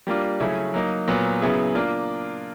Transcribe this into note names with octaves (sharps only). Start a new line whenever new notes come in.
G3 A#3 D4 F4
C#3 F#3 A3 C#4 E4
F#3 A#3 D#4
A#2 F#3 B3
C#3 F#3 B3 E4 G#4
A#3 D4 F4